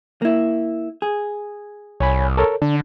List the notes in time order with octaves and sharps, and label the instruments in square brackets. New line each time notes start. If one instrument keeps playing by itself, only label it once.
[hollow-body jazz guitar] A#3 E4
G#4
[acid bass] C2 [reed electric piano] C#5 G#5 B5
[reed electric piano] A4 A#4 C#5
[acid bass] D3 [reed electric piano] D4